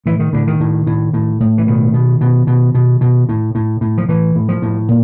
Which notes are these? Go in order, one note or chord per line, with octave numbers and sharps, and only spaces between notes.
A2 E3
D#3
A2 D3
D#3
A2
A2
A2
A2
E3
B2 D#3
B2
B2
B2
B2
B2
A2
A2
A2
F3
A2 E3
A2
F3
A2
A#2